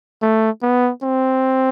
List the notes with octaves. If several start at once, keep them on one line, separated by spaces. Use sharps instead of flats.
A3
B3
C4